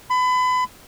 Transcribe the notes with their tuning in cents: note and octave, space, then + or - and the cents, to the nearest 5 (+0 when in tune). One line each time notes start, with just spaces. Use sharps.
B5 +30